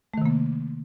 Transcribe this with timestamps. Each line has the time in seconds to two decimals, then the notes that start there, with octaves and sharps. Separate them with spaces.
0.14 A3
0.18 D#3
0.22 C3
0.26 A#3